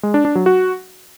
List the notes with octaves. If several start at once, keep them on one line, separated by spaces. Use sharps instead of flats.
G#3
D4
D4
F#3
F#4